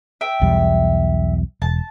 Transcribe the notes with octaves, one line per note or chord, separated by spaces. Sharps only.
E5 G5
B1 E2 G3
E1 A5